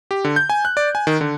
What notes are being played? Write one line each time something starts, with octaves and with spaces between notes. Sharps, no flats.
G4
D3
G6
G#5
F#6
D5
G#5
D#3
D3